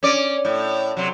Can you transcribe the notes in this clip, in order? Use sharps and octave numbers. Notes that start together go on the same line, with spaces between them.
C#4 D5
A2
C3 F#3